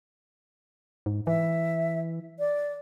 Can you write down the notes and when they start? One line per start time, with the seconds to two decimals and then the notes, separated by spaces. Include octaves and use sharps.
1.06 G#2
1.27 E3 E5
2.39 D5